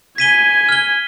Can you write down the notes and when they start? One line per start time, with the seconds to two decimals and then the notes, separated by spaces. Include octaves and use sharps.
0.18 G#5 G#6 B6 D#7 G7
0.69 F6 G7